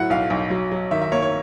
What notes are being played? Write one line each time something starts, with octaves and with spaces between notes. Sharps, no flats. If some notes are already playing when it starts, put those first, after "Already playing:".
Already playing: A2 F#3 F#5
B1 F5
B1
F#3
F#3
D#3 E5
E5
A#3 C#5
C#5